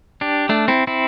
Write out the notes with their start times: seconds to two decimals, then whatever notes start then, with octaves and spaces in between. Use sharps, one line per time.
0.21 D4 G4
0.49 A3 D4
0.68 C4 E4
0.87 C4 E4